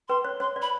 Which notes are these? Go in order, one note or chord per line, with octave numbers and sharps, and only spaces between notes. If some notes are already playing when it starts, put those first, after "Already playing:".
B4 C6
C#5
C#5 C6
D5
B5